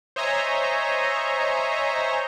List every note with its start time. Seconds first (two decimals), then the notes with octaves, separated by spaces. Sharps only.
0.16 C5 C#5 D#5 E5 G#5 A#5